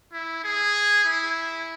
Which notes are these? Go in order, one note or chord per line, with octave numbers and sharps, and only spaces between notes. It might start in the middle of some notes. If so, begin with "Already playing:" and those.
E4
G#4
E4